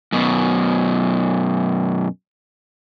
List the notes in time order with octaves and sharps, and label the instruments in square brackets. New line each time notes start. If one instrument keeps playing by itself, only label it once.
[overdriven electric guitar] F#2 B2